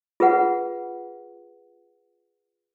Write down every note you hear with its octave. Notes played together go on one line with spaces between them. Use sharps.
F4 G#4 B4 F#5